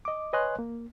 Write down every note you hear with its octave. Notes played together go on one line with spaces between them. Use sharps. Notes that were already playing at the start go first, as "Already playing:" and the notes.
D#5 D6
B4 C#5 D#5 G#5 C6 F#6
A#3